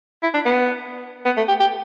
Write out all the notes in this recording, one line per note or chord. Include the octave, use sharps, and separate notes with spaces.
E4
D4
B3
B3
A3
G4
G4